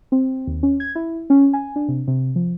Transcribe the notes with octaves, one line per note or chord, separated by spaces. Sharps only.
C4
D#2
C#4
G#6
E4
C#4
G#5
D4
C3
C3
F3